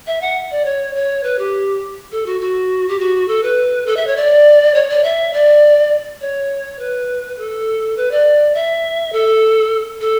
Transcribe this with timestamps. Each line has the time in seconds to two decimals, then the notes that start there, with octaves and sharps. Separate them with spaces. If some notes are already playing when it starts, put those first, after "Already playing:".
0.07 E5
0.21 F#5
0.51 D5
0.65 C#5
0.95 C#5
1.23 B4
1.39 G4
2.12 A4
2.26 F#4
2.41 F#4
2.89 G4
2.99 F#4
3.28 A4
3.43 B4
3.86 A4
3.97 E5
4.07 C#5
4.17 D5
4.74 C#5
4.90 D5
5.04 E5
5.33 D5
6.21 C#5
6.79 B4
7.38 A4
7.97 B4
8.11 D5
8.55 E5
9.12 A4
10.01 A4